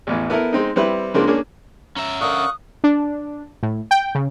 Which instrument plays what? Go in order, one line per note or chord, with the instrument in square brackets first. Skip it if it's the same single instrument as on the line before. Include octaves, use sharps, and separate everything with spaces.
[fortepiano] A1 E2 E3
B3 E4 A4 A#4
G#3 C4 D#4
G3 C4 E4 B4
C#3 G#3 A#3 C4 D4 F4
A#3 C#4 D4 G#4
[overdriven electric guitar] C#4 E5 [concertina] A#5
[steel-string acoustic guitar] D3 A#4 [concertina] F5 C#6 F#6 [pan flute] D#6
[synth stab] D4
A2
G5
C#3